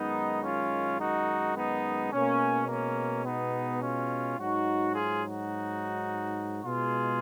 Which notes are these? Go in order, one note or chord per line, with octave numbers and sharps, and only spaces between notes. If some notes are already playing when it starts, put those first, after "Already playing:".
Already playing: F#2 D#3 G#3 B3 D#4
C#4 F4
D#4 F#4
B3 D#4
B2 G#3 A#3 C#4
A#3 C#4
B3 D#4
C#4 F4
G#2 F#3 D#4 F#4
F4 G#4
D#4 F#4
B2 G#3 F4 G#4